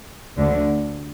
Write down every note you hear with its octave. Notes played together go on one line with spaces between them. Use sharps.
D2 D3